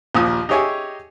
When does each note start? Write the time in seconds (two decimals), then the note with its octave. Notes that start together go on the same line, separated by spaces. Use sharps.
0.15 A#1 D#2 F3 D#6
0.49 D#4 G4 G#4 C#5 E5 G#5